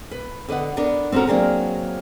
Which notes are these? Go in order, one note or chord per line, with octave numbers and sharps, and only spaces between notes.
B4
D3 B4 D#5 F#5
B3 D4 A#4
C4 C#4 F#4 A4 A#4
F#3 A#3 C4 D4 G#4 A#4